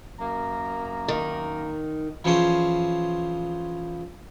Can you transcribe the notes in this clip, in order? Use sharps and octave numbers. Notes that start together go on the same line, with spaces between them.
F#2 A#3 A#5
D#3
E3 F3 C#4 G#4 C5